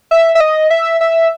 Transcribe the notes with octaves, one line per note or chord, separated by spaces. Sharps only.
E5
E5
D#5
E5
E5